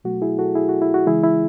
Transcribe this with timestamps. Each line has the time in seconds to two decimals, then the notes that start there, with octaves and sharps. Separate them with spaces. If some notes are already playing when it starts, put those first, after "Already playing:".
0.04 B2 F#3 A3 F#4
0.22 E4 G#4
0.39 F#4 A4
0.55 E4 G#4
0.69 F#4
0.82 E4
0.94 F#4
1.07 C#3 E3 G#3 E4 G#4
1.24 E4